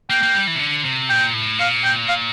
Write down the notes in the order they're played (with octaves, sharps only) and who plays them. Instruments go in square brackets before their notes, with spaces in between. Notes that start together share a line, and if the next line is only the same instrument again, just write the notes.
[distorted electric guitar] A#3 [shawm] G5
[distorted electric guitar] A#3
G3
E3
C3
D3
C3
[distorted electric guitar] A#2 [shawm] G5
[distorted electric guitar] A2
[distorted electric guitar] A#2 [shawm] F5
[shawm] G5
F5